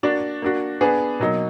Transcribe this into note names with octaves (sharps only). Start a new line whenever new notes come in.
A#3 D4 F#4 D5
A#3 D4 F#4
B3 D4 G#4 B4
B2 F#3 A#3 D#4